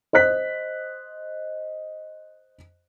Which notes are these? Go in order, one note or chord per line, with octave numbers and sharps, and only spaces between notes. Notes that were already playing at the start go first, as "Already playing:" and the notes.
C5 D#5 F#6 B6